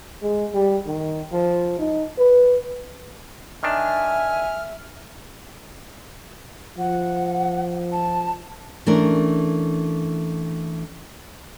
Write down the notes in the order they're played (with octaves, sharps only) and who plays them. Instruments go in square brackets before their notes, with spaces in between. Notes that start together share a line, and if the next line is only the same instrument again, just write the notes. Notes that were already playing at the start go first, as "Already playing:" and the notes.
[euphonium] G#3
G3
D#3
F3
D#4
B4
[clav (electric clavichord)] D#3 D4 [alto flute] E5 [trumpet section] G#5 [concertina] F6
[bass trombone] F3 [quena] F#5
[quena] A5
[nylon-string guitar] E3 A3 C#4 D4 A#4